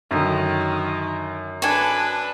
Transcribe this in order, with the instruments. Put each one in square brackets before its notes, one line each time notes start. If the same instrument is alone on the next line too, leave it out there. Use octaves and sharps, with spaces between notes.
[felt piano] F#2 D3 [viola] D#3
[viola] D4 B4 [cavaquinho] A4 G#5